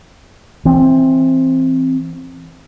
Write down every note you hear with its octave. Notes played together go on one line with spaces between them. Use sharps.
E3 C4